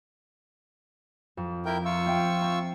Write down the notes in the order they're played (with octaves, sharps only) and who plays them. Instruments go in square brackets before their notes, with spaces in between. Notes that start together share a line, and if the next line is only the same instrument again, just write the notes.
[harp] F2
[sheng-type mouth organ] E4 A#4 G5
F4 C#6 E6
[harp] C4 E5 G5
C4 A#5